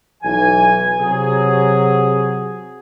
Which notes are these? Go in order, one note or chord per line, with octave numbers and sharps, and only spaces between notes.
B1 E3 G#5
C3 F#3 G#4